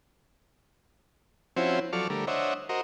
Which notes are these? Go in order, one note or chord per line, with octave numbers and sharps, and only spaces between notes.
F3 C4 C#4 E4 F#4 C5
F3 F#3 A4 D5 C#6 F6
D3 G3 A3 A#4
D4 C5 C#5 D#5 E5 F#5
F#4 A#4 C5 D#5